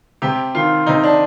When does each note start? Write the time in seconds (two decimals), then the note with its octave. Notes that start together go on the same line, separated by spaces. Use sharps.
0.22 C3 G4
0.55 D#3 F4
0.86 C3 D#4
1.04 D4